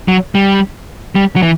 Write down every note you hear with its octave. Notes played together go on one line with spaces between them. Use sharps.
F#3
G3
G3
F#3
E3